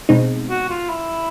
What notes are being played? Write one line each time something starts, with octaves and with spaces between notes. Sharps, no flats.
B2 G#3 C4 D#4
F#4
F4
E4